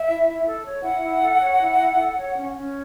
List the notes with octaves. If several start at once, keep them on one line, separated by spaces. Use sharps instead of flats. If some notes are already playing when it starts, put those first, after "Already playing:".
Already playing: E5
E4
E4
A4
C#5
E4 F#5
E4
A4
C#5
E4
E4
A4
C#5
C#4
C#4